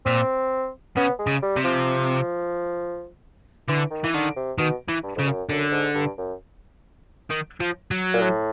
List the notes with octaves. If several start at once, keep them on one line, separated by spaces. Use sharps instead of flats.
A#2 C4
C#3 B3
G#3
C#3
G3
C3
F3
D3 E3
D#3
E3
D3 D#3
C3
B2 D#3
E3
G2
F2 C#3
F#2
F#2 D3
G#2
G2
F#2
D#3
F3
F#3
A#2
A2